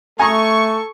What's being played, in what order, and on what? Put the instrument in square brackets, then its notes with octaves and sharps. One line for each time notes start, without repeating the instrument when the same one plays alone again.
[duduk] A3 [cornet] A4 [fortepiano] G#5 A#5 D#6 [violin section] C#6